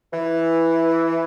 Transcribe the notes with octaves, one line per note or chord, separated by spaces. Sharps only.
E3